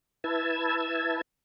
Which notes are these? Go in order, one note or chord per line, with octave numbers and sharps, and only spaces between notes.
E4 B4 A5 E6 G#6